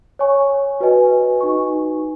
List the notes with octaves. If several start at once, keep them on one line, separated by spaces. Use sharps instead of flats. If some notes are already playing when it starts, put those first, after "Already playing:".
C#5 G#5 C#6
F#4 B4 D#5 G#5
D#4 F#4 B4 G#5 C#6